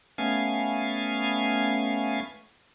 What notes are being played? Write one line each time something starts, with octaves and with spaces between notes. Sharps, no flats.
A3 B3 C#4 F5 G#5